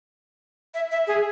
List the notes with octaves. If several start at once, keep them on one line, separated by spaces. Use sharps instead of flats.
E5
E5
G#4